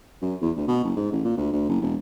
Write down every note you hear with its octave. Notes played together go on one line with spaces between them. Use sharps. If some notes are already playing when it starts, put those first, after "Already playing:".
F#2
E2
D2
B2
F#1
G#2
A1
A#2
D2
D2
F#1
E1